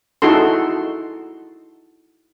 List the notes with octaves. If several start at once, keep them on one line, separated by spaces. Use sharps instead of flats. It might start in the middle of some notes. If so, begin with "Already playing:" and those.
D#4 E4 F#4 G#4 A4 C6